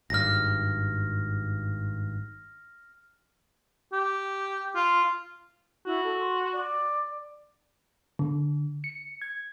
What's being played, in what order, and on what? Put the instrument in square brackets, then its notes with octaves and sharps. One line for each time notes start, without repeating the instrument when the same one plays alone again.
[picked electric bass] G#1 G2 [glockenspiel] F6 A#6
[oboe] G4
F4
[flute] E4 [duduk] F#4
[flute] A4
C6
D5
[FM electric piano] D3
C#7
G#6